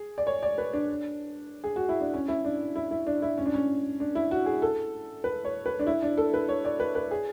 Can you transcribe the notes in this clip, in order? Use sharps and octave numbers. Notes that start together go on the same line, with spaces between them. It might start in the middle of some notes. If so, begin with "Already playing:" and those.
Already playing: G#4
D5
C#5
D5
B4
D4
G#4
F#4
E4
D4
C#4
E4
D4
E4
E4
D4
E4
C#4
D4
C#4
D4
E4
F#4
G#4
A4
B4
C#5
B4
D4
E4
D4
A4
B4
C#5
D5
B4
B4
G#4